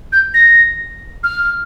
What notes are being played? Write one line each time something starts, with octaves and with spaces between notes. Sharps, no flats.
G6
A#6
F6